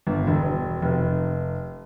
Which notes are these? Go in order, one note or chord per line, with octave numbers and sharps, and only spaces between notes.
G1
E1
F1